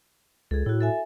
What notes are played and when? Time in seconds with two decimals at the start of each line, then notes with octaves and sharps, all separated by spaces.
0.51 C#2 G#4 A4
0.66 A2 E4 F#4
0.81 A4 E5 G#5